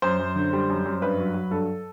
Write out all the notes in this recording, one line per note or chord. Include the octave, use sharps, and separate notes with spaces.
F#2 C5
F#2
D3
G3
F#2
F#2
G2 B4
F#3
F#3
G2 A4